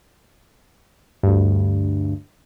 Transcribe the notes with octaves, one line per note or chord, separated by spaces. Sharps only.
D2 G2